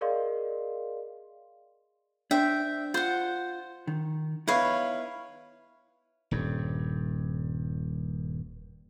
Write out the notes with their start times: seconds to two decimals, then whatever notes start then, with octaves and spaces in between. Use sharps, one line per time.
0.01 G#4 A#4 D5 D#5 F5 C6
2.31 D4 C5 E5 G5
2.94 F4 C5 F#5
3.87 D#3
4.48 B3 D#4 E4 B4 C#5 F5
6.31 D#1 G2